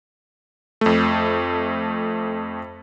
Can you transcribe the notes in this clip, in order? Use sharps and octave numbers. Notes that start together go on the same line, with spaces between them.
F2 A3